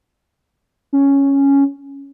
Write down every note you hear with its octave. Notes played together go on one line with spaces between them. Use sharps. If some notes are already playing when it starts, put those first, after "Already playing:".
C#4